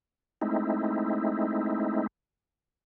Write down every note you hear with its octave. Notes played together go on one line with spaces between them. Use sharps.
G#3 A3 C4 D#4 E4